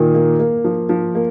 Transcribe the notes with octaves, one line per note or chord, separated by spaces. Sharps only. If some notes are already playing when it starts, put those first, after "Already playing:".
Already playing: A#2 D#3 A#3
A#3
A#3
F3
F3
A#3